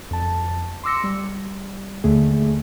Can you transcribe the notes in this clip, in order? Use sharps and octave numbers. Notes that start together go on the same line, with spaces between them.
F2 A5
C6 D6 E6 A#6 C#7
G3
D#2 D3 A3 G#4